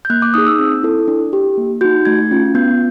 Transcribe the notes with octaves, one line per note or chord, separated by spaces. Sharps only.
G6
A#3 F#6
D6
D#4 G#4 D#6
E6
C4
E4 A4
D4
G4
A#3
D#4 F#4 G6
A3 G#6
C#4 F4
B3 G6